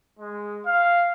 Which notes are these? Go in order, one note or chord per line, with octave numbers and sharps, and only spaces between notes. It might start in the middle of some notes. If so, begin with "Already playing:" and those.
G#3
F5